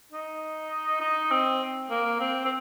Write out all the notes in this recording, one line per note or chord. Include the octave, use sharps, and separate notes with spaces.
D#4
D#4
C4
A#3
C4
C4